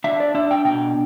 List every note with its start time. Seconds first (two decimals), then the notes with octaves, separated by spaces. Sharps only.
0.04 D4 E5
0.20 D5
0.35 D4 E5
0.51 G5
0.65 B2 G5